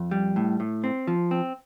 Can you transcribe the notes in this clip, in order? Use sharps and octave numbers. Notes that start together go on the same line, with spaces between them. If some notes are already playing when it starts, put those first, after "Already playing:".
Already playing: F2
G3
A2
A2
C4
F3
C4